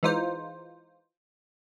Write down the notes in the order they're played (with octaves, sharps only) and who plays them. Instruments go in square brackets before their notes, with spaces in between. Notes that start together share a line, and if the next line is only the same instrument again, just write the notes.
[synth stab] E3 G#3 D#4 F4 C5